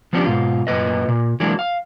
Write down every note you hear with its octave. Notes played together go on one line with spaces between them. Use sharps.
F3 B3 C#4 D4 F4 G4
G#2 B2 F4
F#2 A#2 A#3 B4 D#5
A#2
E3 F#3 G#3 A#3 D4 E4
F5